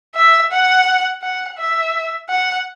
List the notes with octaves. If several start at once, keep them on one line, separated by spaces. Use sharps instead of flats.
E5
F#5
F#5
E5
F#5